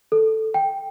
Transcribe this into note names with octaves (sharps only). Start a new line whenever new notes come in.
A4
G5